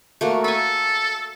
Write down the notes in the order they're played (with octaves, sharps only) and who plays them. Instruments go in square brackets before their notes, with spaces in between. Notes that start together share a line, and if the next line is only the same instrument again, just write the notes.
[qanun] A3 A#3 F#4
[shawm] A4 [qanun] G#5 B5